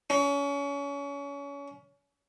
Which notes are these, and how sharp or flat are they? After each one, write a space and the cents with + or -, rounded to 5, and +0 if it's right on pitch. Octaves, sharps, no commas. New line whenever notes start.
C#4 +30